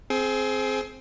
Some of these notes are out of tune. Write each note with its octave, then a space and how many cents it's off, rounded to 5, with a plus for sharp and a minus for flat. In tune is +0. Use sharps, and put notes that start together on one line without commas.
C4 +0 G#4 +25